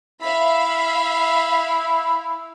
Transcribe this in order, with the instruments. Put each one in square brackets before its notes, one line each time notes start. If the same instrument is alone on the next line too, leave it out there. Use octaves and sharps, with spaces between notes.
[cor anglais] E4 [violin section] E5 F5 B5